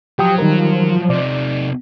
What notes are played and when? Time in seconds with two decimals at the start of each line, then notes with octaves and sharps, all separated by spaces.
0.19 F3 F#3 G4 G5 D#6
0.38 D#3 G3 A#4
1.10 C3 D#4 D5